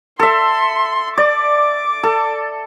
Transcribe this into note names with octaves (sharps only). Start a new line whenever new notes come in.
A4 E5 C6
D5 D6
A4